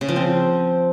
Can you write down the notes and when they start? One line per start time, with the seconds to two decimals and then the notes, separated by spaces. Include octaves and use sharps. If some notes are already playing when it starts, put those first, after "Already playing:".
0.01 C#3
0.09 F3
0.16 C4